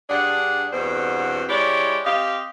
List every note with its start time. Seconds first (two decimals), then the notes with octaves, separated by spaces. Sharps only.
0.09 G2 D4 G#4 D5 F#5
0.73 E2 G2 B2 C4 C5
1.48 G#3 E4 G4 C#5 D5
2.05 C4 G4 D#5 F5